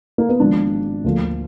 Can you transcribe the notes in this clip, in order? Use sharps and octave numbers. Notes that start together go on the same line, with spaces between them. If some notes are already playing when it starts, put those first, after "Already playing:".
A#3
B3
G#1 G#2 F3 A#3 D4
D2 D3 F3 A#3